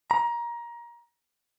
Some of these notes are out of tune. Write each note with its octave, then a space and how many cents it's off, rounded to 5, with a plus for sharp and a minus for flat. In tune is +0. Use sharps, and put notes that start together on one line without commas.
A#5 +20